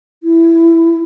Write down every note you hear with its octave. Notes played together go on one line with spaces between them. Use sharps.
E4